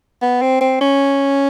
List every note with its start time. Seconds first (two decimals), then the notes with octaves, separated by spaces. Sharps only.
0.22 B3
0.42 C4
0.61 C4
0.81 C#4